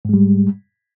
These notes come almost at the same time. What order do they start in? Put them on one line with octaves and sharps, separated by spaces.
G#2 G#3 G3